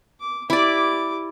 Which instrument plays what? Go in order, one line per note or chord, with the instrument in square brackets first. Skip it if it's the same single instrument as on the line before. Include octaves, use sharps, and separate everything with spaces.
[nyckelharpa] D6
[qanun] E4 D5 [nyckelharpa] G4 D6